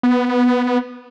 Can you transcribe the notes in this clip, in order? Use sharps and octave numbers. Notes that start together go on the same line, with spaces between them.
B3